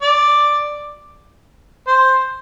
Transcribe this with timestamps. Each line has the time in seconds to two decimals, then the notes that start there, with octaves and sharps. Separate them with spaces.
0.02 D5
1.87 C5